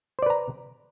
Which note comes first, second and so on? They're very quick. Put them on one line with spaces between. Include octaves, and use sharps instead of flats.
C5 D5 B4 A#5